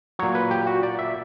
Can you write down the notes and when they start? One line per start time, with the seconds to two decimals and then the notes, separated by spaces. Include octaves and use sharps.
0.19 A#2 F#3 C#5
0.35 B4
0.51 G4
0.67 F#4
0.83 D5
0.99 E5